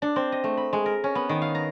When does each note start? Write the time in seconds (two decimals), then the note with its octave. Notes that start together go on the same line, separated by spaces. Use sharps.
0.02 D4
0.16 C4
0.32 D#5
0.44 A3
0.57 B5
0.73 G#3
0.86 A#4
1.04 C#4
1.15 B3
1.29 D#3
1.42 F5
1.55 A#5